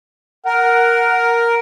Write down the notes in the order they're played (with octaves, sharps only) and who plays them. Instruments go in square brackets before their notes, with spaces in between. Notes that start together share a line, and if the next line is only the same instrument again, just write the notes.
[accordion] A#4 [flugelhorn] F#5